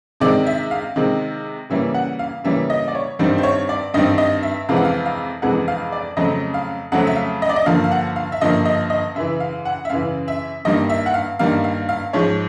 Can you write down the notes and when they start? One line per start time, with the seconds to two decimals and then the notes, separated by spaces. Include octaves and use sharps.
0.20 C3 D#3 G#3 C4 D5
0.46 E5
0.71 F5
0.96 C3 D#3 G#3 C4
1.70 C#3 E3 G3 A#3 C#4 E5
1.94 F#5
2.19 F5
2.44 C#3 E3 G3 A#3 C#4 E5
2.70 D#5
2.88 D5
2.95 C#5
3.19 G2 D#3 G3 C4 C5
3.38 C5
3.43 C#5
3.69 D5
3.94 G2 D#3 G3 C4 D#5
4.18 D#5
4.43 E5
4.69 F2 C3 E3 G#3 C4 F5
4.77 F#5
4.85 F5
5.06 F5
5.42 F2 C3 E3 G#3 C4 F#5
5.68 F5
5.92 D5
6.17 F2 C#3 F#3 A3 C4 D#5
6.54 F5
6.92 F2 C#3 F#3 A3 C4 F#5
7.07 E5
7.16 F5
7.42 D#5
7.49 D5
7.56 D#5
7.66 G2 D3 F3 A#3 F5
7.84 F5
7.91 F#5
8.16 F5
8.32 E5
8.41 G2 D3 F3 A#3 D#5
8.65 D#5
8.90 D#5
9.15 F#2 C#3 E3 E5
9.40 F5
9.65 F#5
9.85 E5
9.90 F#2 C#3 E3 F5
10.28 E5
10.65 G2 D#3 G3 A#3 D#5
10.89 E5
11.06 F#5
11.14 F5
11.39 G2 D#3 G3 A#3 F5
11.64 F5
11.89 F5
12.13 G#2 F3 G#3 C#5